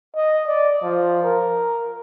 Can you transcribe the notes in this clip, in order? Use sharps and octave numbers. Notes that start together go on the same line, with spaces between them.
D#5
D5
F3
A#4